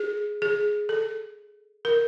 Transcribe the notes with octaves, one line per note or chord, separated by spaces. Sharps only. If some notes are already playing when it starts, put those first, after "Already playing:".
Already playing: G#4
G#4
A4
A#4